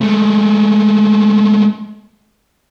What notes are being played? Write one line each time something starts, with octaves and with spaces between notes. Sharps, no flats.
G#3 A3